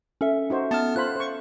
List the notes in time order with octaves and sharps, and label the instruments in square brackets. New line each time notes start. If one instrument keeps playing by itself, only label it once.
[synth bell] C#4 A4 E5
[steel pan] D#4 F#4 C5
[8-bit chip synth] B3 F6 [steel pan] A5
[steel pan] F4 C5 B5 [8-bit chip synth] F#6
[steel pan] C5 C#6